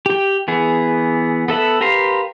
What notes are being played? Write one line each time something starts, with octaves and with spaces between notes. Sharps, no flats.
G4 G5
E3 B3 G#4
B3 A4 E5 F#5
G4 A#4 B4 F5 C6